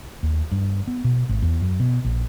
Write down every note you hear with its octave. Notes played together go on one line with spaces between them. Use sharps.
D#2
G2
B3
B2
G#1
E2
F#2
B2
A#1